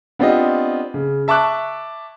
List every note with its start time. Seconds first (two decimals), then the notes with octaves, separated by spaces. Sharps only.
0.19 B3 C4 D4 F4 G4 D#5
0.94 C#3
1.28 E5 A5 C#6 D6 F#6